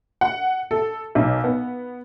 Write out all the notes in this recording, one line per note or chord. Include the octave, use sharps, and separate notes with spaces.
F#5
A4
B1
B3